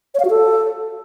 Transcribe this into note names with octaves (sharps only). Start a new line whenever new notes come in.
C#5
F5
F#4
A4